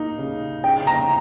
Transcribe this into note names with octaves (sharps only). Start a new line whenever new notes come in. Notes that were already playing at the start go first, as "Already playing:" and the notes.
Already playing: A#3 D#4
C#3
C#3 G5
A#5